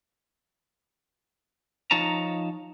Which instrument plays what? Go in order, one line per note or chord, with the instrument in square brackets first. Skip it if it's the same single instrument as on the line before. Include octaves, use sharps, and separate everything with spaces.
[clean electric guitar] F3 D#4 C#5 A5 A#5